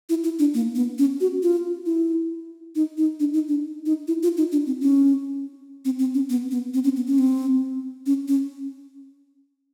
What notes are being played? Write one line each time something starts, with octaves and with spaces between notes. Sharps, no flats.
E4
E4
D4
A#3
B3
C#4
F#4
F4
E4
D#4
D#4
D4
D#4
D4
D#4
E4
F4
D#4
D4
C4
C#4
C4
C4
C#4
B3
B3
C4
C#4
B3
C#4
C4
C#4
C#4